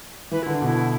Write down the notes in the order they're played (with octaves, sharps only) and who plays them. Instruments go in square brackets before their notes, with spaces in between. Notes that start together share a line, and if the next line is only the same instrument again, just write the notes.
[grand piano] E3 [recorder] B4
[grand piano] D3 [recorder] E4
[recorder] D4
[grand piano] B2
[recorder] E4